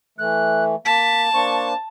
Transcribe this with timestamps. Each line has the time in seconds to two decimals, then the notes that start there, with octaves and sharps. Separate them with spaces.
0.18 E3 A3 F#6
0.85 A#3 A5 B6
1.34 A#3 D4 C5 C#6